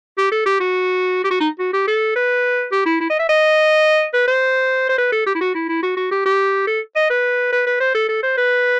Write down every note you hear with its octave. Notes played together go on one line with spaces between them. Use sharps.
G4
A4
G4
F#4
G4
F#4
D#4
F#4
G4
A4
B4
G4
E4
E4
D#5
E5
D#5
B4
C5
C5
B4
A4
G4
E4
F#4
E4
E4
F#4
F#4
G4
G4
A4
D#5
B4
B4
B4
C5
A4
A4
C5
B4